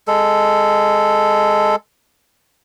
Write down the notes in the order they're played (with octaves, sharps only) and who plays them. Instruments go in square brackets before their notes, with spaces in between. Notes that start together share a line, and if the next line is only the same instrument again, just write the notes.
[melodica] G#3 A4